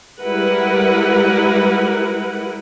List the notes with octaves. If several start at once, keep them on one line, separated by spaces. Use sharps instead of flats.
G3 G#3 E4 A#4 B4 F#5